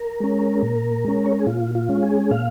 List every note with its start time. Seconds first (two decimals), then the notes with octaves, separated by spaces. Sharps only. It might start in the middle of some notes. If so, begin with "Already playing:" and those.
Already playing: A#4
0.20 G#3 C#4
0.62 A#2
1.04 G#3 C#4
1.26 C#5
1.32 A#4
1.40 G#4
1.46 A#2 F4
1.75 F4
1.89 G#3 C#4
2.03 G#4
2.31 A#2 F5